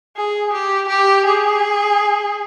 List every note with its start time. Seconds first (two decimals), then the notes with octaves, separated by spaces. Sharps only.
0.16 G#4
0.53 G4
0.88 G4
1.26 G#4